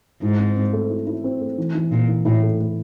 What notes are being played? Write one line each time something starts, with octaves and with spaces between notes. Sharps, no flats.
G#2 E4
C4
C4
A3
E4
E4
C4
A3
E3
E3
A#2 E3
E3
A2 E4
A3
A3